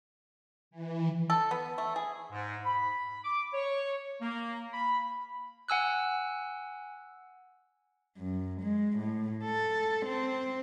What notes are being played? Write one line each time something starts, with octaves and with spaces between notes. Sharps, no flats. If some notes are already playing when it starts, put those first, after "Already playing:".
E3
A4
B3
A3
G#4
G#2
B5
D6
C#5
A#3
B5
F#5 G#5 E6 F#6
F#2
G#3
A2
A4
C4